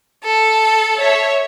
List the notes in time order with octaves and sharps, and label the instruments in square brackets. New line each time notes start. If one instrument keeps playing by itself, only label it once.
[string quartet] A4
[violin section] C#5 E5